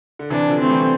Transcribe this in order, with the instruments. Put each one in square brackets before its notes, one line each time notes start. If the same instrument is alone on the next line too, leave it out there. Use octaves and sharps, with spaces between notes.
[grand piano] D3
[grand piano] C3 E3 [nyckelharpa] D4
[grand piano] D3 F3
[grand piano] A3 [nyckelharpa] C4
[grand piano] E3 G3
A3